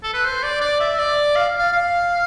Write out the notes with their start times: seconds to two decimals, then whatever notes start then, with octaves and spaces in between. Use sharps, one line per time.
0.03 A4
0.14 B4
0.25 C5
0.43 D5
0.61 D5
0.80 E5
0.99 D5
1.35 F5
1.58 F5
1.72 F5